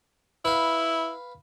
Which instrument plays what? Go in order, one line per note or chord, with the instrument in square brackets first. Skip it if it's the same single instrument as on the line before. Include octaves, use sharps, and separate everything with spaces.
[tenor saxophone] E4 [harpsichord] B4 F5